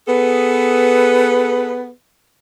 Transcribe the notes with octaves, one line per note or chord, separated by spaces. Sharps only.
B3 G#4 A4 B4